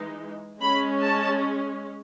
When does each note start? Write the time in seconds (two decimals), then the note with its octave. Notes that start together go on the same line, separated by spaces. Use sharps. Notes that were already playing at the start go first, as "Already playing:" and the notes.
Already playing: E3 G#3 D#4
0.61 G#3 C#4 B5
1.01 A5